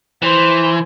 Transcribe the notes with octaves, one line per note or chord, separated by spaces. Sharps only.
E3 C5